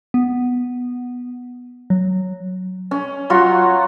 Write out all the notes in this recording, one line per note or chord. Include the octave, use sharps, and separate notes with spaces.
B3
F#3
C#4
F#3 F4 F#4 C#6